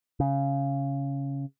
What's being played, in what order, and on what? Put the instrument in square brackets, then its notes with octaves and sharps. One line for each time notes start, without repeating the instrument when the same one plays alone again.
[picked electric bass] C#3